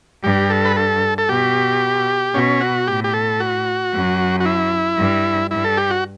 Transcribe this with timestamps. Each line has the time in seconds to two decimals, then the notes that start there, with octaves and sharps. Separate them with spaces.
0.23 G2 G4
0.50 A4
0.65 B4
0.76 A4
1.18 A4
1.29 B2 G4
2.34 B2 C#4
2.61 F#4
2.87 A2 G4
3.04 G4
3.13 A4
3.40 F#4
3.93 F#2
4.40 F#4
4.45 E4
4.98 G2
5.51 G2 E4
5.64 A4
5.77 G4
5.90 F#4